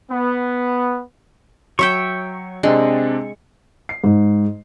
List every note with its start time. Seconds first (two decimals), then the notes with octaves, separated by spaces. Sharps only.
0.10 B3
1.79 F#3 C#5 E5 G5 C#6
2.63 C3 G#3 C4 D4
3.89 C7
4.04 G#2